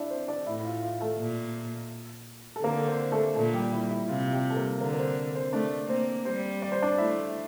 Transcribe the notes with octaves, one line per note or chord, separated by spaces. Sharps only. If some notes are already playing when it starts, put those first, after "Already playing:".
Already playing: D4 E4 D5 E5
C4 C5
D4 D5
A2 E4 E5
E4
F4
F4
A3 A4
A#2
A4
D3 A#3 A#4
C4 C5
A3 A4
A#2 A3 A4
G3 G4
E4
E4
C3 F4
F4
G3 G4
A4
A#3 A#4
D3 A#3 A#4
A#4
C4 C5
C4 C5
A3 D4 D5
A#3 C4 C5
G3 C4 C5
D5
C5
D4 D5
A3 E4 E5